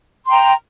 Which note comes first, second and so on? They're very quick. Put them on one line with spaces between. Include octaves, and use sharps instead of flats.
C6 G5 A#5